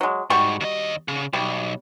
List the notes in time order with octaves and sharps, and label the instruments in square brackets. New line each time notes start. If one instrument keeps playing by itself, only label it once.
[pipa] F#3 G#3
[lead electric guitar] G#2 [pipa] G3 F#4 C#6
[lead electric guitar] D#2 D#5
C#3
[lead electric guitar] B1 [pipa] G3